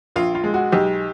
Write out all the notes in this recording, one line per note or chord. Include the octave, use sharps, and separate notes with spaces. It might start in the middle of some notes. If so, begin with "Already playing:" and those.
A#1 F4
F4
G#3
F#4
B1 G4